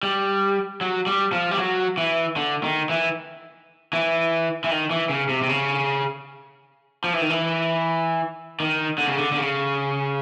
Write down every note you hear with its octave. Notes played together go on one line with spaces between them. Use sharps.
G3
F#3
G3
F3
G3
F#3
E3
D3
D#3
E3
E3
E3
D#3
E3
C#3
C3
C3
C#3
F3
E3
D#3
E3
D#3
D3
C#3
D3
D3
C#3